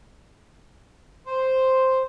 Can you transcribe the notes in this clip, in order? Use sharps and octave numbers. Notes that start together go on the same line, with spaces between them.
C5